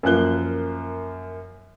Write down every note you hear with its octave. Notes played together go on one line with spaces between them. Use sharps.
F#2 F3 A#3 F#6 G7